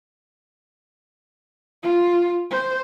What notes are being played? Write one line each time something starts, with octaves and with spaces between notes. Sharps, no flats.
F4
C5